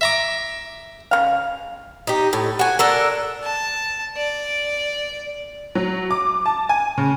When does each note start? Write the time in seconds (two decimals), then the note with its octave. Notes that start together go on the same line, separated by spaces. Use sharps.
0.01 E5 A#5 D6
1.11 C#3 A#3 F5
2.07 D#4 G4
2.33 A2
2.59 F#4 G#5
2.79 D4 A4 A#4
3.44 A5
4.17 D5
5.75 F#3
6.11 D6
6.46 A5
6.69 G#5
6.98 C#3